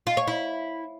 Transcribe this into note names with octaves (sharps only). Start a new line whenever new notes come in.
F4
C#5
E4